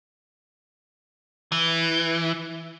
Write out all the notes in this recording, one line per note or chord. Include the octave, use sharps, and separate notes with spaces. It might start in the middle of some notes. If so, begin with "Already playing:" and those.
E3